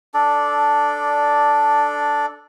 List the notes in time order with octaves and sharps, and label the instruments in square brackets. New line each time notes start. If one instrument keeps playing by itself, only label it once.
[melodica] D4 A4 D5